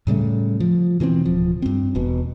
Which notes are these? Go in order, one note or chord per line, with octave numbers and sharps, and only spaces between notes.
A2 C#3 G3 A3
F3
B2 E3 A3 C4
D1 F3
G2 C4
E1 B2